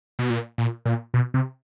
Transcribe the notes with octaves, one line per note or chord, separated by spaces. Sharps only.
B2
A#2
A#2
A#2
B2
C3